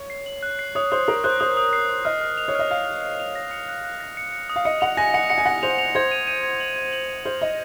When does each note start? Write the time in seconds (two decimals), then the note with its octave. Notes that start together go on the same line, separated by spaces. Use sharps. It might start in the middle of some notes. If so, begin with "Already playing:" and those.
Already playing: C#5
0.10 C7
0.26 F#7
0.43 F#6
0.59 C7
0.75 C#5 D#6
0.92 C5 D#6
1.08 A#4 D#6
1.24 C5 F#6
1.40 C5 D#6
1.57 D#6
1.73 C7
1.89 D#6
2.05 D#5 F6
2.21 F6
2.38 F7
2.48 C#5
2.55 D#5 F6
2.71 F5 F6
2.86 F6
3.03 F6
3.20 F7
3.35 A#6
3.51 C#7
3.68 F#6
3.84 F#6
4.00 A#6
4.17 C#7
4.32 C#7
4.49 D#6
4.56 F5
4.65 D#5 C#7
4.81 F#5 F7
4.97 G#5 A#6
5.14 F#5 C#7
5.30 F#5 C#7
5.38 G#5
5.45 F#5 A#6
5.63 C5 F7
5.79 F7
5.95 C5 G#6
6.11 D#7
6.27 D#7
6.43 G#6
6.60 F#7
6.76 G#6
6.93 F#7
7.09 D#7
7.25 C5 F6
7.41 D#5 C#7